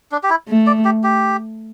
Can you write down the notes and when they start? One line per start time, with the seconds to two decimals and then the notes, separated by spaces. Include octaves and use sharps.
0.12 D4
0.23 G4
0.30 E4
0.49 A3
0.67 D5
0.85 G4
1.04 G4